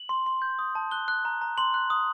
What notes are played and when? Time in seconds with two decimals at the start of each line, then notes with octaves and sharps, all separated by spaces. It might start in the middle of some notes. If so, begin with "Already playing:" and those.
Already playing: F#7
0.09 C6
0.26 C6
0.42 G6
0.59 D#6
0.75 A5
0.91 F#6 G7
1.08 F#6
1.25 A#5
1.41 A#5
1.58 C6 F#7
1.74 F#6
1.90 D#6